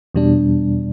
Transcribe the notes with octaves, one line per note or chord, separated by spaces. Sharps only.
E2 B2 G3 D4